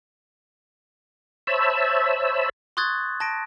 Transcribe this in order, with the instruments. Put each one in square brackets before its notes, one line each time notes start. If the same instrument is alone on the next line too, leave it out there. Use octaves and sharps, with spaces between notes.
[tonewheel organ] C5 C#5 E5 A5 B5 E6
[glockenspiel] C6 C#6 D#6 F#6 G#6 A6
A5 A#6 D7